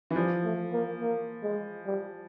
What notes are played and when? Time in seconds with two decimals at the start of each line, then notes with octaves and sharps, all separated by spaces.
0.11 E3
0.16 F3 G3
0.44 A3
0.73 A#3
1.01 A#3
1.43 G#3
1.86 G3